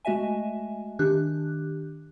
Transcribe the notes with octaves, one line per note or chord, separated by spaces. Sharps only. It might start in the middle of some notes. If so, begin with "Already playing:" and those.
G#3 A3 F#4 D#5 E5 G#5
D#3 D4 G4 F#6